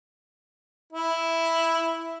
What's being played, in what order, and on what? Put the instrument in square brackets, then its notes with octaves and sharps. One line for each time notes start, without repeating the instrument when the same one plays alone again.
[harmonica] E4